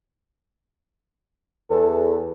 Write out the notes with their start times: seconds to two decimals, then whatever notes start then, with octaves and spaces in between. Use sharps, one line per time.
1.71 E2 A4